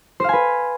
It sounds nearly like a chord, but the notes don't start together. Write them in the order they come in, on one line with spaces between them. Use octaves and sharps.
C5 F5 G#5 B4